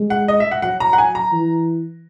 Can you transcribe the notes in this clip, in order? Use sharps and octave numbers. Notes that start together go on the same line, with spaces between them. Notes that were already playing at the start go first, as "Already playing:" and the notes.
Already playing: G#3
F#5
D#5
E5
F#5
F#3 F#5
A#5
F#5
G#5
A#5
E3